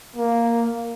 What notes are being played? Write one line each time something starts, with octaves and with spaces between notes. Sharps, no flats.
A#3